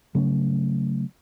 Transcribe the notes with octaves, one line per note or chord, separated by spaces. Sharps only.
C#3 F#3 A3 C#4